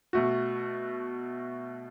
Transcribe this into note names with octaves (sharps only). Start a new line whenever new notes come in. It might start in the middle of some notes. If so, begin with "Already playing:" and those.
B2 A3 F#4